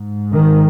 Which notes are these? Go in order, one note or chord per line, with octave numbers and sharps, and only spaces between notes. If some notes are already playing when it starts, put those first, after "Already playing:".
Already playing: G#2
D#3